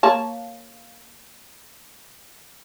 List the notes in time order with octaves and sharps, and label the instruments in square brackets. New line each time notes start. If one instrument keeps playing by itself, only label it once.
[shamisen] A#3 C#5 A5